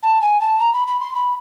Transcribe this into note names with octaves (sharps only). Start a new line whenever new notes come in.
A5
G#5
A5
A#5
B5
B5
C6
B5